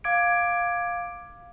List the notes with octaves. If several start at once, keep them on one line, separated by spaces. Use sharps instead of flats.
F5 D6 G#6 D7